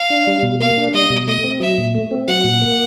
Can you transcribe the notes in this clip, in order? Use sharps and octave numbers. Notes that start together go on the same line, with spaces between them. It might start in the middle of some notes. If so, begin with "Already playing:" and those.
Already playing: F5
D4
G3
B2
A#3 F5
D4
G3 D#5
B2
A3 D#5
C4
F#3 E5
A#2
A3
C4
F#3 F#5
A#2
A#3